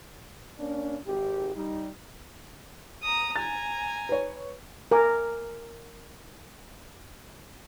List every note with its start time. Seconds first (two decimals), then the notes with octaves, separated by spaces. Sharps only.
0.59 A#3 C#4 D4
1.06 G#1 G4
1.56 G3 D#4
3.03 A#5 D#6
3.36 G#5 A#5 A6
4.09 B4 C#5
4.91 A#4 G#5 D6